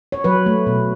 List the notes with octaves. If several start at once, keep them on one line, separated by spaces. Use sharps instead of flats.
C#5
F#3 B4
A3
B2